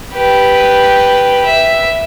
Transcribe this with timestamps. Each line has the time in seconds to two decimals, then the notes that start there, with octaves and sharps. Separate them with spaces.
0.14 G4 B4
1.46 E5